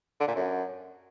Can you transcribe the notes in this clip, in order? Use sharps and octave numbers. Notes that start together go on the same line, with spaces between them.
D3
A#2
F#2